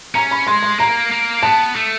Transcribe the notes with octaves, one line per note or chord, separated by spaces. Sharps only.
C#4 A#5
B5
G#3 C6
C6
A#3 A#5
A#3
B3 A5
A3